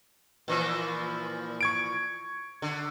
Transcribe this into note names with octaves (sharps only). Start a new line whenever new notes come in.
A#2 E3 F3
C#6 G#6 D7
D3